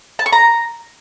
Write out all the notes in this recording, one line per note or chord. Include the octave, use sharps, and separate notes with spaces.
A5
C#6
A#5